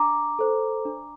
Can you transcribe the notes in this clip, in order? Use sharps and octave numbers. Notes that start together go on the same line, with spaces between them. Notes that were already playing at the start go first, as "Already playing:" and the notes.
Already playing: D4 A#5 D6
A4 C5
D4